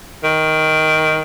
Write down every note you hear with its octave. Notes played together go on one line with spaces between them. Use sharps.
D#3